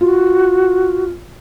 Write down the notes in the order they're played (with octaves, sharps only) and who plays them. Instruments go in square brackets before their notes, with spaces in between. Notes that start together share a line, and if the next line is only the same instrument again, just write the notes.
[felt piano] F4 [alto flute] F#4